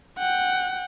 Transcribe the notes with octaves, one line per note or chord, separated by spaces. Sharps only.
F#5 G5